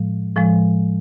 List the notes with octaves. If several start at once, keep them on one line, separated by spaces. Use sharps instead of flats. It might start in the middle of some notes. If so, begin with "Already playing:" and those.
Already playing: A2 F3 G#3
A2 F3 G#3